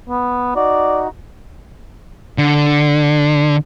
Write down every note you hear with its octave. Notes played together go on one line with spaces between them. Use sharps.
B3
D#4 F#4 D5
D3